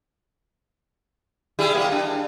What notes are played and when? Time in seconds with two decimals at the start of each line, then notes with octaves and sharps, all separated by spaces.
1.59 G3 E4 G#4
1.75 A#3
1.91 D4